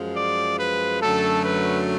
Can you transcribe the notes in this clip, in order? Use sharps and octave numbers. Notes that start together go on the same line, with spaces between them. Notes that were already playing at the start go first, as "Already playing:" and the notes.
Already playing: F#2 F3 G#3
D5
B4
F#2 D3 F#3 A3 A4
B4